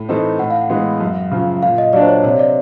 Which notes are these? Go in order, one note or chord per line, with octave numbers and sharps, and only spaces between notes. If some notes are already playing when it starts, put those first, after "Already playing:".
Already playing: A2
E3 A3 C4 D#4
A2 F#5
F5
F#5
E3 G#3 B3
F#2
C#3 F3
A#2 F5
D#5
F#3 A#3 D4 D5
C5
C#5
C3 C#5
D5